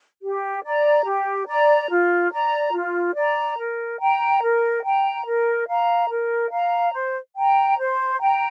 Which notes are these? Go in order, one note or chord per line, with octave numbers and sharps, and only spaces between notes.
G4
D5 A#5
G4
D5 A#5
F4
D5 A#5
F4
D5 A#5
A#4
G5 A#5
A#4
G5 A#5
A#4
F5 A#5
A#4
F5 A#5
C5
G5 A#5
C5
G5 A#5